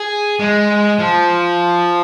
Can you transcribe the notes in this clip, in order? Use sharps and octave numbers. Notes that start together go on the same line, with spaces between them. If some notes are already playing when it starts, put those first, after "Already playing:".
Already playing: G#4
G#3
F3